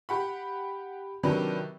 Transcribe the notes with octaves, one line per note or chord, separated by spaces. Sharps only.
G4 F#5 B5
C3 D#3 F#3 D4 B4